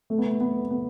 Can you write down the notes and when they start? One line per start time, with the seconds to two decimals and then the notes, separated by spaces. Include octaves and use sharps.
0.10 A3
0.18 B3
0.26 A3
0.40 B3
0.71 B3